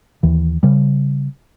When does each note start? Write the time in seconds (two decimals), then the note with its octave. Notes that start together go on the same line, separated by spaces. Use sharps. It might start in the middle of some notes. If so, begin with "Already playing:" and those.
0.23 D#2 E3
0.63 C#3 G3